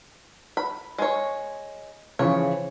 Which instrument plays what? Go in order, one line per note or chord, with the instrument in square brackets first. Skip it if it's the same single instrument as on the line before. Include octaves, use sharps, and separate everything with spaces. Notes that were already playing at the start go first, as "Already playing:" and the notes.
[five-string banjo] B5
G#3 C#5
[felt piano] C#3 E3 F3 [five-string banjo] C#5